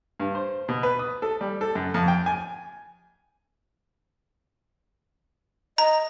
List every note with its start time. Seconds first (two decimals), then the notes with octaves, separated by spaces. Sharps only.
0.20 G2
0.35 C5
0.69 B2
0.83 B4
0.99 D#6
1.22 A4
1.41 G3
1.61 A4
1.75 F#2
1.94 F2
2.08 G5
2.26 G#5
5.78 D#5 A#5